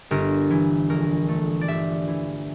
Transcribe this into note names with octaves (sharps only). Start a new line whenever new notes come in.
G1 A#4
E3
A#1 A#4
A3
D5
G1 E5
E3